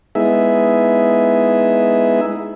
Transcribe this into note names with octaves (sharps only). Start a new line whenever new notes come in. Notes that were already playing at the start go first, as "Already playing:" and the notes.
G#3 B3 D#4 E4 G#4 E5